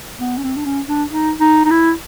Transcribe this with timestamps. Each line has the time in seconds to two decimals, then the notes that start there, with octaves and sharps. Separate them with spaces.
0.20 B3
0.38 C#4
0.43 C4
0.57 D4
0.65 C#4
0.88 D4
1.10 D#4
1.40 D#4
1.65 D#4
1.71 E4